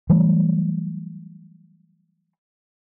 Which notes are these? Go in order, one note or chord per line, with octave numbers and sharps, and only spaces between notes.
E3 F#3 G3 A3